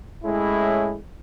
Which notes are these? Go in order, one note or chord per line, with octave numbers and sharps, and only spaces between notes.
A2 G#3 C#4 E4